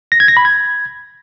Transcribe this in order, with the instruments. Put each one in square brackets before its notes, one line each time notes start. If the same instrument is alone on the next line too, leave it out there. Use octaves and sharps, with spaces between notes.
[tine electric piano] A#6
G#6
A#6
B5
G#6